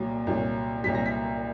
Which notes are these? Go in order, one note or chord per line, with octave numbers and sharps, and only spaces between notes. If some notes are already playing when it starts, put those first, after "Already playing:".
Already playing: C2 A#2 F#3
C2 A#2 F#3
C2 A#2 F#3 B6
A#6
B6